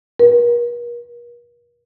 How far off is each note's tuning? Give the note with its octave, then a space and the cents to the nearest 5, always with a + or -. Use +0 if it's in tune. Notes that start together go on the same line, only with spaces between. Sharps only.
A#4 +45